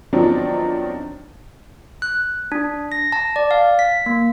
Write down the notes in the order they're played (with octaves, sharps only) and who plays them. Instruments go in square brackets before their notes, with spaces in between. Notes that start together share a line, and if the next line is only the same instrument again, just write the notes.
[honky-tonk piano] D#3 F3 F#3 B3 C4 D4
[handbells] F#6
D4
A#6
A5
D5
F5
B6
A#3